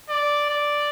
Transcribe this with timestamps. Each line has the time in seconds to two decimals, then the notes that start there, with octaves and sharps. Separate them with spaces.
0.10 D5
0.50 D5